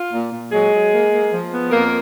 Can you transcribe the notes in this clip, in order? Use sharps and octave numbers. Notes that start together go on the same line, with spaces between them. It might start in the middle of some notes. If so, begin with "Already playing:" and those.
Already playing: F4
A#2
A#2
F#3 G#3 G#4
F#3
A#3
A#3
F3
B3
F2 A#3 A#4